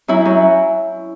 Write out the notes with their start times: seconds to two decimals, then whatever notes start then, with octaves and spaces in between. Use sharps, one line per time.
0.08 F#2 E4
0.25 F#2